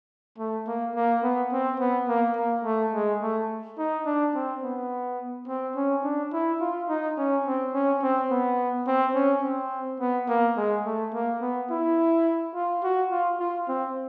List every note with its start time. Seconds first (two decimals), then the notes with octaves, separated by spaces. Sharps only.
0.38 A3
0.68 A#3
0.95 A#3
1.23 B3
1.53 C4
1.80 B3
2.09 A#3
2.37 A#3
2.65 A3
2.94 G#3
3.22 A3
3.78 D#4
4.06 D4
4.35 C4
4.63 B3
5.48 C4
5.76 C#4
6.04 D4
6.33 E4
6.61 F4
6.89 D#4
7.17 C#4
7.46 C4
7.74 C#4
8.02 C4
8.31 B3
8.87 C4
9.15 C#4
9.43 C4
10.00 B3
10.29 A#3
10.57 G#3
10.86 A3
11.14 A#3
11.41 B3
11.70 E4
12.55 F4
12.83 F#4
13.11 F4
13.40 F4
13.68 C4